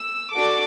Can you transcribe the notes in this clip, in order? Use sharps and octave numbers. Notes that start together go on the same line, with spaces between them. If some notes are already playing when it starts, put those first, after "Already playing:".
Already playing: E6
D4 F#4 A4 D6